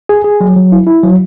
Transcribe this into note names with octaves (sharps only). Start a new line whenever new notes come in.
G#4
G#4
F#3
F#3
E4
E4
F#3